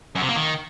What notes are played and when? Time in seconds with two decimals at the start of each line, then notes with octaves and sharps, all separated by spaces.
0.15 F#2
0.22 C3
0.29 A#3
0.35 D#3